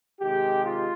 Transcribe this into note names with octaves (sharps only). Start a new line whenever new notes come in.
C3 D#3 G#3 G4
F4